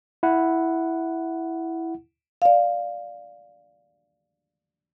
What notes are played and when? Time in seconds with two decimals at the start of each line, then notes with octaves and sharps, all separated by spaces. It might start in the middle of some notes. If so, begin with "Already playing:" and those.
0.23 E4 F#5
2.42 D5 F5